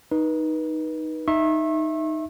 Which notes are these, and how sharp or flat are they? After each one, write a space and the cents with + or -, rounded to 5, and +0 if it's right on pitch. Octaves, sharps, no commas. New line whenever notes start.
D#4 +0 B4 -30
D#4 +0 E5 +0 C#6 -40